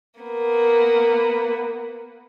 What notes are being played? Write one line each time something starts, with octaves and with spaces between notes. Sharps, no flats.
A#3 B3